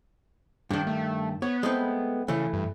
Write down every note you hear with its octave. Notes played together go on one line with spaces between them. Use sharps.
G2 D#3 D4
A3
B3 C#5
G#3 A3 C4
C#3 E3 A3
G2